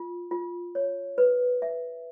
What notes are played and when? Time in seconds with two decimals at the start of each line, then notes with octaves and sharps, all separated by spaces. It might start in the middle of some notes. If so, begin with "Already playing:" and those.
Already playing: F4
0.31 F4
0.75 C#5
1.18 B4
1.62 E5